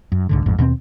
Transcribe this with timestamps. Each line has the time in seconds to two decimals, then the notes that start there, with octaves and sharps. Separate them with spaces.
0.12 F#2
0.29 C2 G#2 D3
0.46 A1 F2 G#2
0.58 D#2 B2 A#3 C4